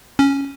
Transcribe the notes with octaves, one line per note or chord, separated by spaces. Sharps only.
C#4